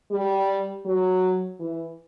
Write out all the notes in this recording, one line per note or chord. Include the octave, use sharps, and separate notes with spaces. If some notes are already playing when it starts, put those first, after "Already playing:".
G3
F#3
E3